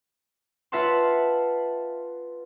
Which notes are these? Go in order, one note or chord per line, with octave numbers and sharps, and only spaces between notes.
F4 B4 E5 F#5 A5 C6